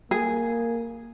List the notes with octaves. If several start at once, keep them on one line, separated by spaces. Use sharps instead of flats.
A#3 G#4